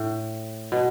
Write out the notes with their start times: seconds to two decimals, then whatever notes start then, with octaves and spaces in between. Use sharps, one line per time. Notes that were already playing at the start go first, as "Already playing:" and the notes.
Already playing: A2
0.72 B2